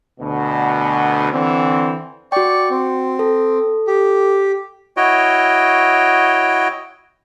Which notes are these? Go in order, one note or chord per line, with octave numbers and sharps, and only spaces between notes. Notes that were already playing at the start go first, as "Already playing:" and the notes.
D2 B2
D3 E3 C4
F#4 D5 G5 C#6
C4
A4
G4
E4 F#4 C#5 D#5 G5